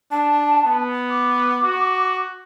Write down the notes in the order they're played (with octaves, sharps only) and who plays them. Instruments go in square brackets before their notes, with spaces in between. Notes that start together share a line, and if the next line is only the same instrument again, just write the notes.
[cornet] D4 [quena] A5
[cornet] B3
[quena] D6
[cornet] F#4